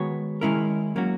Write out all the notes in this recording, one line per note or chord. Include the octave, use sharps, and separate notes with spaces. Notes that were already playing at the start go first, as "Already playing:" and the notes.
Already playing: D#3 G#3 B3 F#4 C#5
D#3 G#3 C#4 E4 A#4
F#3 A#3 C#4 F#4